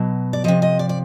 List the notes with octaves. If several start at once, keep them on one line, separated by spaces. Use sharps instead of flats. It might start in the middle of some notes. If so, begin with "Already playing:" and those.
Already playing: B2 F#3
D5
C3 F3 D#5
D#5
D5
D5